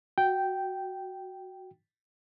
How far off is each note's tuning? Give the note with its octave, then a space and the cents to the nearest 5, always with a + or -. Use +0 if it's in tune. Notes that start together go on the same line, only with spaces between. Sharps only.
F#4 +0 G5 -5